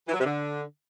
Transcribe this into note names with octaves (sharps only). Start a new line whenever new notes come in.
E3
F#3
C3
D3